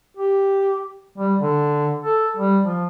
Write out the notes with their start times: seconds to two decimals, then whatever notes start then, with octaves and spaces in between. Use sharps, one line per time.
0.17 G4
1.18 G3
1.40 D3
2.02 A4
2.37 G3
2.66 F3